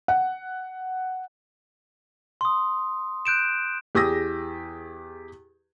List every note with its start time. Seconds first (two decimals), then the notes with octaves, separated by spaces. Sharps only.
0.08 F#5
2.41 C6 D#6
3.25 F#6 G6 D7 E7
3.95 E2 G4 G#4 D#6 E6 A#6